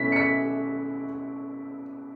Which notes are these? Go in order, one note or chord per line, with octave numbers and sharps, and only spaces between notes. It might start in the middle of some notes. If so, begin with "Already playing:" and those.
Already playing: B2 A3 C#4 E4 B6
C#7
B6